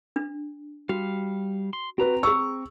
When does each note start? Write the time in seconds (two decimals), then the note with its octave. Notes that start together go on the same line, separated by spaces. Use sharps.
0.16 D4
0.89 G3 F#4 F5
1.73 C6
1.98 C4 F#4 B4 A#5
2.23 G#4 C#6 E6